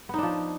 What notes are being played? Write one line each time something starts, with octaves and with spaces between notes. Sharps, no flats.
F3 B3 D4 D#4